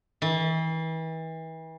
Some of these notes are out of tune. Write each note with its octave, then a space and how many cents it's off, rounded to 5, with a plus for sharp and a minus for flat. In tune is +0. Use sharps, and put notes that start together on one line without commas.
E3 -35